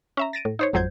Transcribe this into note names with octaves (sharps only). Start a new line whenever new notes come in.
C#4 E5 A#5
A6 A#6 D7 D#7
A2
D#4 C5 C#5
G#1 F2 F#3 C5 G6 G#6